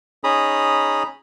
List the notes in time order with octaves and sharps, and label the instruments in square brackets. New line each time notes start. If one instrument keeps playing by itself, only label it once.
[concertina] C#4 D#4 G#4 A#5 B5 D#6